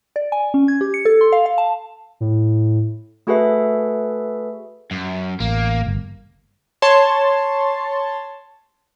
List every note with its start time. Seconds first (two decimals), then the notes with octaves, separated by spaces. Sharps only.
0.16 D5
0.32 G#5
0.54 C#4
0.68 G#6
0.81 G4
0.94 C#7
1.05 A4
1.21 C6
1.32 F5
1.46 F5
1.58 A5
2.20 A2
3.27 A3 F#4 G#4 A4 B4 E5
4.91 F#2
5.40 A1 A#3
5.87 G1
6.82 C#5 A5 C6